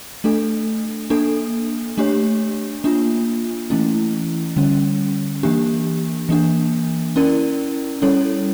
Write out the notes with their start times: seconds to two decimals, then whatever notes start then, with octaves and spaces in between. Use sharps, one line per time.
0.24 A3 D4 A4
1.10 A#3 D4 A4
1.98 A3 D4 G4 C#5
2.84 A#3 D4 F4
3.70 E3 A3 C#4 E4
4.57 D3 G3 C#4
5.43 E3 A#3 D4 G4
6.29 E3 A#3 D4
7.16 C#4 E4 A#4 D5
8.02 G3 C#4 E4 A4 C#5